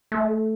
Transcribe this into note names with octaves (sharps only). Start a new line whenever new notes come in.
A3